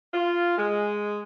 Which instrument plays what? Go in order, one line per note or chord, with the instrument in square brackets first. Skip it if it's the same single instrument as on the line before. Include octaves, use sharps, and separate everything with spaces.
[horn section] F4
G#3